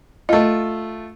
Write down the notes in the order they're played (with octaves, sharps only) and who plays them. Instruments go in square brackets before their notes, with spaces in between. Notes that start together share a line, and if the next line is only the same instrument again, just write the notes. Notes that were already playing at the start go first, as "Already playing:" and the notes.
[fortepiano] A3 F4 [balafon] D#5 A5